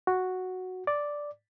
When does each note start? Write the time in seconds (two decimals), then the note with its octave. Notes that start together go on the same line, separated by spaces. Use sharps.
0.07 F#4
0.87 D5